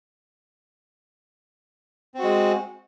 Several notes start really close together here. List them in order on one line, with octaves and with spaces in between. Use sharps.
C4 F#4 G#3